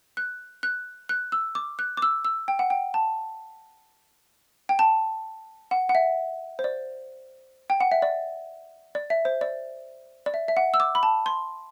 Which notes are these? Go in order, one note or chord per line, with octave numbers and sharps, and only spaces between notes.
F#6
F#6
F#6
E6
D6
F#6
D6
E6
E6
G5
F#5
G5
A5
G5
A5
F#5
F#5
E5
C5
D5
G5
F#5
E5
D5
D5
E5
C5
D5
D5
E5
E5
F#5
E6
D6
B5
A5
C6